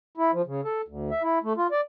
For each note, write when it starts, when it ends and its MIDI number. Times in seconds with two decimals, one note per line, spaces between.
0.17 0.31 64
0.33 0.42 53
0.47 0.61 49
0.65 0.82 69
0.88 1.10 38
1.11 1.22 76
1.23 1.39 64
1.44 1.53 57
1.57 1.67 65
1.72 1.81 74